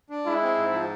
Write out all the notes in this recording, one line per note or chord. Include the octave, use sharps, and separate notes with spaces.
D4
G#3 E4
C4
G#2
F3